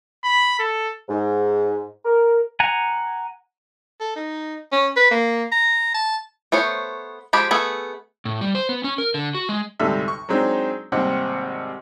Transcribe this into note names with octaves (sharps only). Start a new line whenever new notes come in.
B5
A4
G#2
A#4
F#5 G#5 A#5
A4
D#4
C#4
B4
A#3
A#5
A5
A3 B3 C5 C#5
F3 G#3 G4 A5 B5
A3 B3 G#4 E5
A2
G3
C5
B3
C#4
A#4
D3
F#4
G#3
D2 G#2 C3 G3 A4 E5
C#6
F#3 G#3 C4 D4 D#4
G#1 D#2 C3 G3 C4 F#5